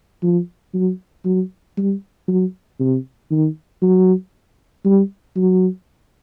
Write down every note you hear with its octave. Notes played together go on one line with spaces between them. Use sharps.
F3
F#3
F#3
G3
F#3
C3
D#3
F#3
G3
F#3